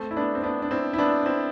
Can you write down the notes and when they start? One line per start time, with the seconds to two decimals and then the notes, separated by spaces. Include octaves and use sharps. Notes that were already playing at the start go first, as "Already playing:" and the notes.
Already playing: A3 C4
0.11 E4
0.16 B3 D4
0.35 C4
0.43 B3 D4
0.62 D4
0.71 C4 E4
0.93 E4
0.98 B3 D4
1.26 C4 E4